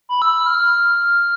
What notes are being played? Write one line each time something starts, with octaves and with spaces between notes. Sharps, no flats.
B5
E6
E6
F6